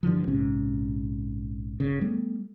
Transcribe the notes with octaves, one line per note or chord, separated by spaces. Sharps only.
G2 D3 E3 F3
A#1 G#2 C3 C#4
G1 C#3
G3 A3 B3